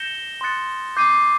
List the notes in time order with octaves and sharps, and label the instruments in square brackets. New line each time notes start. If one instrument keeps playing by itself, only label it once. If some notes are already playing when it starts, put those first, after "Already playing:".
Already playing: [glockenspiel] G6 A#6 C#7 E7 G7
C6 D#6 F#6 A6 C#7
D6 G6 C7 D#7